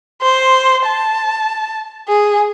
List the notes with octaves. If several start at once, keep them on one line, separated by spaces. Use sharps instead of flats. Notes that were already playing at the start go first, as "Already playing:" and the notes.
C5
A5
G#4